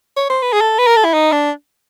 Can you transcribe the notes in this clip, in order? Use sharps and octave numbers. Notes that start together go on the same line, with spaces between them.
C#5
C5
B4
G#4
A4
B4
A#4
A4
E4
D#4
D4